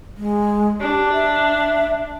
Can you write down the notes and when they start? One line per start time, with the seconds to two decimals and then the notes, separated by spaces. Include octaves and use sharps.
0.17 G#3
0.80 D4 G4
1.13 E5